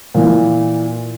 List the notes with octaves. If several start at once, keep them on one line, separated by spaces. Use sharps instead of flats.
A#2 E3